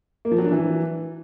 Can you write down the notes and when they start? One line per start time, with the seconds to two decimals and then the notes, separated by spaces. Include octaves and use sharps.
0.25 A#3
0.32 F3
0.38 F#3
0.45 D4
0.52 E3